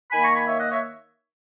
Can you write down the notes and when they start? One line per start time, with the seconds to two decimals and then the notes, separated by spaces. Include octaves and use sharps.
0.11 D#3 A#3 G#5 B5
0.24 A#5 C#6
0.36 G#5 B5
0.48 C#5 E5
0.60 D#5 F#5
0.72 C#5 E5